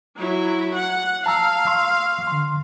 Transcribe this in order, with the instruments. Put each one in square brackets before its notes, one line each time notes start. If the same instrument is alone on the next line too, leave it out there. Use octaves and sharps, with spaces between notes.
[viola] F#3 E4
F#5
[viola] F5 [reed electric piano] A5 A#5 E6
[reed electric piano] C6 C#6 E6
D3 C6